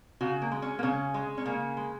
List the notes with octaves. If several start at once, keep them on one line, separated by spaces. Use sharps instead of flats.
C#3 F#4
A#3
G#3
C#4
A#3
C#3 C#4
G#3
C#4
C#3 A#3
G#3